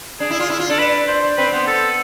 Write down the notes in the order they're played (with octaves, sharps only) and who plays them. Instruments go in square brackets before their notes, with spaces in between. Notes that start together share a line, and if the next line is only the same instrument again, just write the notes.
[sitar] D4 [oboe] G#4
[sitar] E4
F4
E4
F4
[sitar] D4 [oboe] A4
[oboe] B4
C5
[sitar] C4 [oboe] B4
[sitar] B3 [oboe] C5
[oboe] A4